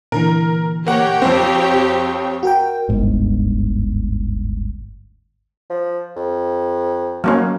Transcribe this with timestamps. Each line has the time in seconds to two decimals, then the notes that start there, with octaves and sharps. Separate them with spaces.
0.12 A#2 D3 E3 A#4
0.87 A#3 G4 C#5 F#5 G5
1.22 F2 C4 C5
2.43 F#4 A#4 G5
2.89 D1 G1 G#2
5.70 F3
6.16 F2
7.24 F#3 A#3 C#4